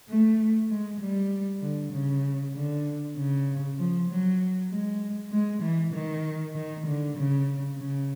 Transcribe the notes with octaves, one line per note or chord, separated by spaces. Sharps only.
A3
G#3
G3
D3
C#3
D3
C#3
F3
F#3
G#3
G#3
E3
D#3
D#3
D3
C#3
C#3